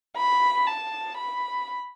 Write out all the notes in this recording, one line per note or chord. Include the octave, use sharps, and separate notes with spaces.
B5
A5
B5